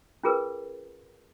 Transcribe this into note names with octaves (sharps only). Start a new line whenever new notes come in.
C#4 F4 G#4 A#4 B4